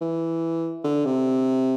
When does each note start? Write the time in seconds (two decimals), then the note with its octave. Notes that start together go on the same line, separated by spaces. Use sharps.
0.02 E3
0.84 D3
1.05 C3